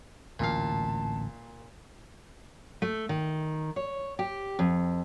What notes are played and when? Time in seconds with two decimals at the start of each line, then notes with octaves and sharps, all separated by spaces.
0.39 D1 A1 A#2 F5 A5
2.82 A3
3.09 D#3
3.76 C#5
4.19 G4
4.59 F2